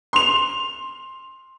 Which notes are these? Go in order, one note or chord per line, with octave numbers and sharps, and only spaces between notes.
C6 F7